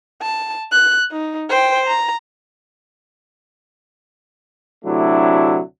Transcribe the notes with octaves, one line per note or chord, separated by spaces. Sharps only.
A5
F#6
D#4
C5 G5
A#5
D2 C3 F#3 A3 D4 E4